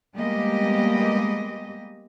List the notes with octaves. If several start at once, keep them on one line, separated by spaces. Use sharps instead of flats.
G3 G#3 A#3 B3 G4 D#5